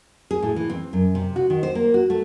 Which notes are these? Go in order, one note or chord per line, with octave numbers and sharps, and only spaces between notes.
G#4
A2
E3
C4
F#2
C3
F#4
D#3
C5
A#3
F#4
A3